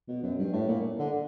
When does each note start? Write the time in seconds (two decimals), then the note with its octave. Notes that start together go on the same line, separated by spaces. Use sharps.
0.08 B2
0.23 F#2
0.39 G2
0.53 A2
0.68 A#2
0.99 D3